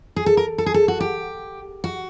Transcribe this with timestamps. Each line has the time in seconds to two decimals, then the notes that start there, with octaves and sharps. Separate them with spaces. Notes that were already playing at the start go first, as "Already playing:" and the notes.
0.16 G#4
0.26 A4
0.37 A#4
0.58 A4
0.66 G#4
0.74 A4
0.88 F#4
1.00 G4
1.84 F#4